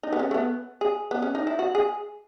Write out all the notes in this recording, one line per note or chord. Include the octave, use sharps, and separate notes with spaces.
D#4
B3
C#4
A3
B3
G#4
B3
C#4
D#4
E4
F#4
G#4